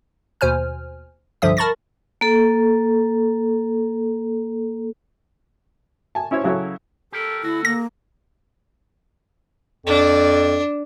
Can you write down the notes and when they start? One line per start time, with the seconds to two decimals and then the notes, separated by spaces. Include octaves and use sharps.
0.41 D#2 B2 C5 G#5 F6
1.42 C2 G2 D3 F3 E5 D#6
1.57 A#4 A5 B5 C#6 A6 A#6
2.21 A#3 A4
6.15 G#5 A5
6.31 C#4 E4 C5 C#5
6.44 C#3 F#3 E4 A4 C#5
7.12 G4 A4 A#4
7.43 D2 E4 F#4
7.65 A#3 A#6
9.86 F2 D4